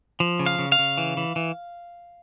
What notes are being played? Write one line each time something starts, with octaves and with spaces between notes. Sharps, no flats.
F3
C#3
F5
C#3
F5
C#3
E3
E3
E3